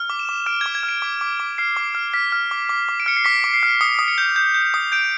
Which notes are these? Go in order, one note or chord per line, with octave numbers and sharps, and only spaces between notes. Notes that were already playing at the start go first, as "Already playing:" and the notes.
Already playing: F6
D6
E7
D6
F6 D7
G#6
D6
G#6
F6
D7
D6
D6
D6
F6 C7
D6
F6
F6 B6
F6
D6
D6
D6
D7
F6 C#7
C7
D6 B6
D6
C7
F6
D#6 C#7
D#6
C#7
G6
G6
G6
D#6
G6 D7